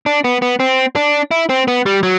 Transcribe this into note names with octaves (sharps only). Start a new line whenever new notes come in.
D4
B3
B3
C4
D4
E4
C4
B3
G3
F#3